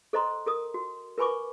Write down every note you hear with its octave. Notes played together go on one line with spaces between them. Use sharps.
A4 C5 D#5 A#5 C6
A4 A#4 D#6
F#4
A#4 B4 G#5 B5 C#6 D6